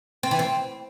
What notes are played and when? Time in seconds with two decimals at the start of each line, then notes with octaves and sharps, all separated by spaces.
0.23 C4
0.31 E3
0.39 C4